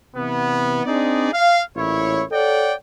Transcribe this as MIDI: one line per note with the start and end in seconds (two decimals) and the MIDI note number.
0.14 0.84 48
0.14 0.84 52
0.14 0.84 59
0.85 1.30 60
0.85 1.30 62
0.85 1.30 63
0.85 1.30 68
0.85 1.30 74
1.32 1.61 77
1.75 2.23 33
1.75 2.23 46
1.75 2.23 64
1.75 2.23 73
2.31 2.73 69
2.31 2.73 73
2.31 2.73 74
2.31 2.73 78
2.31 2.73 79